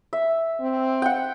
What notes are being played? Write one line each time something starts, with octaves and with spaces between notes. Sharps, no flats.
E5
C4
F#5 G5